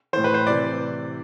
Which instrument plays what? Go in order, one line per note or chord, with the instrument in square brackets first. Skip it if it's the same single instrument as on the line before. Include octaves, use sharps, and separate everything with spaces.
[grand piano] A2 E3 C5
B4
C5
C3 E3 D5